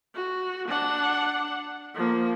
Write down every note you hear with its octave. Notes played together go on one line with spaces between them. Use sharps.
F#4
D4 F#5
F3 A#3